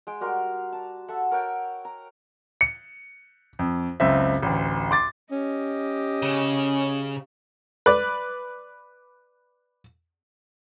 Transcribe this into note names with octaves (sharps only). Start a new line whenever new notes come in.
G#3 G5
G3 F#4 A#4 C6
A5
A4 E5 F#5
A#4 C#5 F#5 G5
A#5
C#7
F2
F#1 C#2 C4 E5
A1 D2
C6 D6 A6
C#4 G4 D#5
C#3
B4 D5